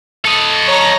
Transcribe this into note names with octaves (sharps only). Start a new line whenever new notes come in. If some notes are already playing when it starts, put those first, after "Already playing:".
A4 D#5
C#5 A#5